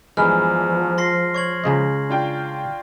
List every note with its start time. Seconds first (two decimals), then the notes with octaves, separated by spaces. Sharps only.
0.17 E2 G2 F3 G#3 B4 F6
0.98 C6 A#6 C7
1.34 C#5 C#6 G#6 F#7
1.64 C#2 C#3 D#5
2.09 D4 F4 G5